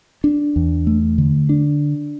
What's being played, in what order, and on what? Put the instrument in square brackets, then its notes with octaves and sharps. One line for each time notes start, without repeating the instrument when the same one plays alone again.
[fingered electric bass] D4
E2
A3
D3
D4